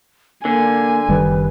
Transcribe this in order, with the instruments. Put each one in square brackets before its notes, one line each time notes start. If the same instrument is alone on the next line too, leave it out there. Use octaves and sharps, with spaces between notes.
[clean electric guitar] D3 [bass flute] A#3 [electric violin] G#5
[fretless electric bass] F#1 D#3 G3 [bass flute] B4